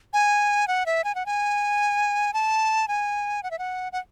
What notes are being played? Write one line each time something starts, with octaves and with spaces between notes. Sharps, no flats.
G#5
F#5
E5
G#5
F#5
G#5
A5
G#5
F#5
E5
F#5
F#5